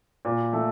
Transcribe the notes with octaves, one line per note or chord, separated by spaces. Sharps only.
A#2
A3